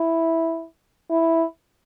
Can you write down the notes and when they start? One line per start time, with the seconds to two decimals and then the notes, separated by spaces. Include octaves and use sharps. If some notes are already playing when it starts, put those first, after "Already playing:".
Already playing: E4
1.10 E4